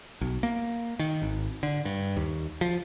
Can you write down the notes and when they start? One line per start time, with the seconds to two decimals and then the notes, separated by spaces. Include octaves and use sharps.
0.21 B1
0.43 A#3
0.99 D#3
1.22 G#1
1.63 D3
1.85 G2
2.17 D#2
2.61 F3